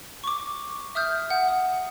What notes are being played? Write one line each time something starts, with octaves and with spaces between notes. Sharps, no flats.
C#6 D6
E5 D#6 F6 G6
F#5
D#6